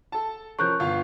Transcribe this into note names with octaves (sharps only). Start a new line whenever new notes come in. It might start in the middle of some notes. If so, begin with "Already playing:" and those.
A4 A5
F3 C#4 A#4 C#6 F#6 G6
G1 F4 F5